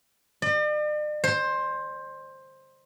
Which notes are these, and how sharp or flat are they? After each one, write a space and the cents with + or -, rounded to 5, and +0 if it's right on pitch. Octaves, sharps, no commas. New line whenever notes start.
D5 +45
C5 +15